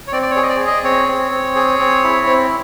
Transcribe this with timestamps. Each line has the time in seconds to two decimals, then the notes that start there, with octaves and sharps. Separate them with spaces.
0.07 C#5
0.12 C4 D5
0.22 D5
0.30 C#5
0.36 G#4
0.43 D#5
0.49 D5
0.60 G#4
0.67 D#5
0.84 C4 C#5
1.08 C4
1.31 C4
1.56 G#4
1.79 C4
2.04 E4
2.27 C4